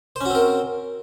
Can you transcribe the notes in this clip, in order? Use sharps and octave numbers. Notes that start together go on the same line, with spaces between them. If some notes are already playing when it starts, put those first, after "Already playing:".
C4 C#4 F#4 A#4 C5